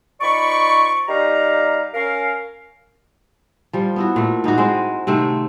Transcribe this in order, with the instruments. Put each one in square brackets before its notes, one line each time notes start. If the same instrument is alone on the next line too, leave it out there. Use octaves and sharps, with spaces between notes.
[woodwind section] F3 D#4 D5 B5 C#6
G3 D#4 G4 F5 A#5
C#4 A#4 F5
[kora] F3 G3
B3 E4 F#4
A#2 A3
G#2 D#4 E4 F#4
G#3 C4
C3 D#3 A3 C4